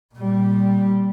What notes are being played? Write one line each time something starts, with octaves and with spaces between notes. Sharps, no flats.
A#2 G3